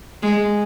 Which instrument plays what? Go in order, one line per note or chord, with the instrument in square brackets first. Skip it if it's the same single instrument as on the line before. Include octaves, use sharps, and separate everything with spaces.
[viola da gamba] G#3